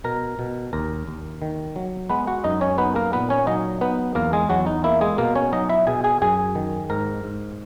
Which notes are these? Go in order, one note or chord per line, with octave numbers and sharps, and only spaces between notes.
B2 A#4 A#5
B2
D#2 A#4 A#5
D#2
D#3
F#3
G#3 B3 B4
F#4 F#5
F#2 D#4 D#5
C#4 C#5
B3 D#4 B4
A#3 A#4
A#2 B3 B4
C#4 C#5
F#3 D#4 D#5
B3 D#4 B4
E2 A#3 A#4
G#3 G#4
E2 F#3 F#4
D#4
A#3 E4
G#3 G#4
B2 A#3 A#4
C#4 C#5
F#3 D#4 D#5
E4 E5
B2 G#4 G#5
G#4 G#5
F#2 G#4 G#5
D#3
G#2 A#4 A#5
G#2